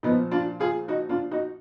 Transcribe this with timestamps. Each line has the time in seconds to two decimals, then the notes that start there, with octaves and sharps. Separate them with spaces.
0.03 A#2 F3 B3 D#4
0.31 D4 F4
0.60 F4 G#4
0.88 D#4 F#4
1.09 D4 F4
1.31 D#4 F#4